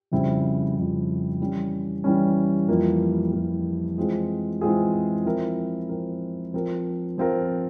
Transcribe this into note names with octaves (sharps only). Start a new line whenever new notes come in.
F2 C#3 G3 C4 E4
F2 C#3 G3 C4 E4
E3 G3 C#4
E3 G3 C#4
F2 E3 G3 A#3 F4
F2 E3 G3 A#3 F4
E3 G#3 C4 F4 G#4
E3 G#3 C4 F4 G#4
F3 C4 E4 A#4
F3 C4 E4 A#4
F3 C4 F4 A#4
F3 C4 F4 A#4